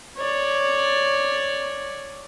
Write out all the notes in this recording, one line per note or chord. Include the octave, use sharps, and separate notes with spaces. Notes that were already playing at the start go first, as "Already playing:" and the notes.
C#5 D5